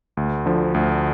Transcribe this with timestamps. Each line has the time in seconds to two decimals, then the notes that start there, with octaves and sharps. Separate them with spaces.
0.17 D2
0.46 D3 F3
0.74 D2